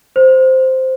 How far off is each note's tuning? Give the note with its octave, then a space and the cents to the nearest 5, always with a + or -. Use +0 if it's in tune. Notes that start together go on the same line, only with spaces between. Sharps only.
C5 -5